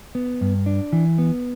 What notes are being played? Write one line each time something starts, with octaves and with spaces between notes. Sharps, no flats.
B3
G2
D4
E3
B3